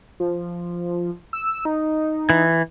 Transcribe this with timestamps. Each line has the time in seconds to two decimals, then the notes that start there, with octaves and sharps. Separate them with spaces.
0.20 F3
1.33 E6
1.65 D#4
2.30 E3